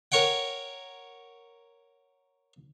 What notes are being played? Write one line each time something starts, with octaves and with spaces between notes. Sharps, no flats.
A#4 C#5 F#5 G5